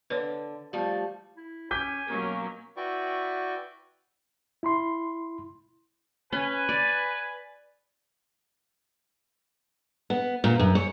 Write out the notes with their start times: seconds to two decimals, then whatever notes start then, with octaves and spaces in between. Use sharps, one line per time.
0.10 D3 B4 C#5
0.73 F3 G3 A3
1.37 E4
1.71 C#4 G#5 D6 G6 B6
2.08 B2 F#3 A#3 C#4 A#4
2.77 E4 F#4 B4 D5 G5 C#6
4.63 E4 B5 C6
6.32 C#4 B4 G#5
6.69 D5
10.10 B3
10.44 A#2
10.59 F#2
10.75 C#5